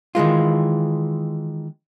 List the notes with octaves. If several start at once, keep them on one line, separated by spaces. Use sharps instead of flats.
D#3 E3 G#3 F4